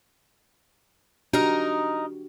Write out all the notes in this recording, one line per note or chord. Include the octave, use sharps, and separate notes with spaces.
D4 D#4 F#4 G4 A#4